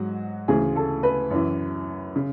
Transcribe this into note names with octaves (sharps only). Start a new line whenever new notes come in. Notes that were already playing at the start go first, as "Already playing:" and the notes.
Already playing: G#2 F#3 F#4
D2 C#3 E3 G#4
A4
B4
F#2 E3
C#3